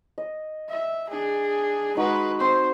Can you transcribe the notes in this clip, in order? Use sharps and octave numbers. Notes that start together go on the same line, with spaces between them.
D#5
E5
D4 G#4
G#3 D#4 F#4 B4
C4 C5